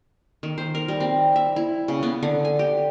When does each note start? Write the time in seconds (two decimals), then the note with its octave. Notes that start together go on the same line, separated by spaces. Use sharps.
0.43 D#3
0.58 C5
0.75 A#4
0.88 G3
1.00 C4
1.36 E5
1.56 E4
1.88 C#3
2.03 B3
2.23 D3
2.45 G#5
2.59 G4